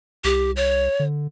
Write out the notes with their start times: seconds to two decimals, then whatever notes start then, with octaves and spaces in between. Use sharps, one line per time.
0.24 C2 G4
0.56 C#5
0.99 D3